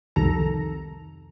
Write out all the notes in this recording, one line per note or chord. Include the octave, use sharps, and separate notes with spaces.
C2 F2 C3 D#3 A4 A#5